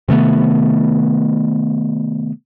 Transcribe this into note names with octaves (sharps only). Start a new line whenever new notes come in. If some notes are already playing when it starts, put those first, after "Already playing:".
C3 D#3 A3 B3